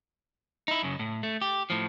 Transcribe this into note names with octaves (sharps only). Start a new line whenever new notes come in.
D#4 E4
F#2 C#3
A2
A3
G4
A2 F3